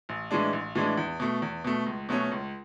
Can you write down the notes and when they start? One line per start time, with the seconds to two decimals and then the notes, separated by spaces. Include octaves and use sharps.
0.09 A1
0.31 A2 E3 G#3 D4
0.53 A1
0.75 A2 E3 G#3 D4
0.97 E2
1.20 B2 A3
1.42 E2
1.64 B2 A3
1.86 C#2
2.09 B2 F#3 A3 C#4
2.32 C#2